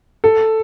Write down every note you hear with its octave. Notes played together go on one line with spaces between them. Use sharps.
A4